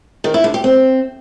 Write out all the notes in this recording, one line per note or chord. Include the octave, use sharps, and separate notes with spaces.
D#3
E4
D3
G4
C4